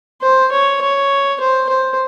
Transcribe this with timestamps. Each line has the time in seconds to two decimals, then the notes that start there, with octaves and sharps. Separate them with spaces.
0.21 C5
0.52 C#5
0.81 C#5
1.40 C5
1.69 C5